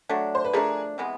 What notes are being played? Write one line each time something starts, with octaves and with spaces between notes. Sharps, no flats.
F#3 A3 D4
C5
B4
F3 A3 D4 G#4 A#4
C3 E3 G#3 B3